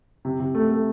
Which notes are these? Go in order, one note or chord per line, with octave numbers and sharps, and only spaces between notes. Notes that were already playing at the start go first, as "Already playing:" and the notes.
C3
C3
A3
A3